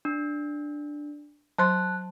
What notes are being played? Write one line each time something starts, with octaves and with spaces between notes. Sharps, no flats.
D4
F#3 C5 A5 C6 F#6